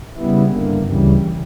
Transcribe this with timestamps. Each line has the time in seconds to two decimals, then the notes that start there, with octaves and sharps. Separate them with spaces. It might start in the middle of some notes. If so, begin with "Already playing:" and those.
0.16 C#3 G3 B3 E4
0.51 G2 D3 A#3
0.85 D2 C#3 E3 G3